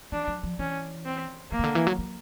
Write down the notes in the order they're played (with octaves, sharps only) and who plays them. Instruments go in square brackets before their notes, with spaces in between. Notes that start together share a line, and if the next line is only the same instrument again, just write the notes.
[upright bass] E3 [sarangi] D4
[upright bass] F#3
F3
[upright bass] E3 [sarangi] C#4
[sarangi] C4
[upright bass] D#3 [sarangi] A#3
[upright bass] C#3
D3
E3
F#3
F#3